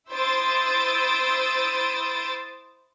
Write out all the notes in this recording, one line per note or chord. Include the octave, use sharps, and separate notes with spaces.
E4 C5 D#6 E6 A6 D7